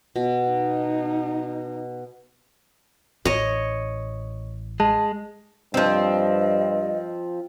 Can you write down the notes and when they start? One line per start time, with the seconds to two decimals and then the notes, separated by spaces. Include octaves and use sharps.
0.16 B2
0.48 D#4
3.25 A1 C#5 D#5
4.80 G#3 A5
5.74 G2 F3 C4 D#5